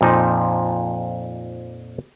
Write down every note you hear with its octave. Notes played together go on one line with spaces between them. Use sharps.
F2 A#2 F3 D#4